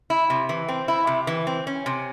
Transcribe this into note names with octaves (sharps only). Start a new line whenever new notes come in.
E4
C3
E3
C4
E4
C3
E3
C4
C#4
C3